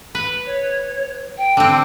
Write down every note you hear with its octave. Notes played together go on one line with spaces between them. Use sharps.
B4
C#5
G5
D3 C4